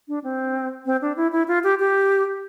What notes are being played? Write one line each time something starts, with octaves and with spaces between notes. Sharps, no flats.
D4
C4
C4
D4
E4
E4
F4
G4
G4